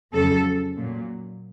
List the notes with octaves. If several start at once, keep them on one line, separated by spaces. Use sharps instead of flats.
F2 C#3 F#3 A4
A#2 F#3